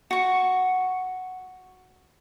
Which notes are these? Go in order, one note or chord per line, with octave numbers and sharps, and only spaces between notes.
F#4 C#6